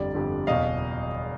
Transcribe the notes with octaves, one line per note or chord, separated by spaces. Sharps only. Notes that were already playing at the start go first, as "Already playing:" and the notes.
Already playing: G1 F2 D3 G3 D5
G1 F2 D3 G3
F#1 E2 B2 D#5 F5